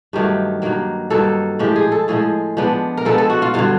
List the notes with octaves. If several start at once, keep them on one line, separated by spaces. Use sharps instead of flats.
G2 D#3 F#3 A3 G4
G2 D#3 F#3 A#3
G2 D#3 F#3 A#3 A4
A2 F3 G#3 G4
G#4
A4
A2 F3 G#3 G#4
F3 G#3 B3 D4
A#4
F3 G#3 B3 D4 A4
A4
F#4
F4
G2 D3 F#3 F4